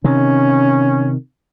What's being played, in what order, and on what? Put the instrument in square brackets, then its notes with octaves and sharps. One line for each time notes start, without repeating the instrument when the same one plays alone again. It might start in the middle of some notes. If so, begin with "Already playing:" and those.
[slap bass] C3 D#3 [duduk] C#4